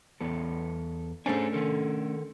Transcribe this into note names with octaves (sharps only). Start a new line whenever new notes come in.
E2 B3 A4
A3 C#4 D4 G#4 C5 G#5
D#3 A4 A#4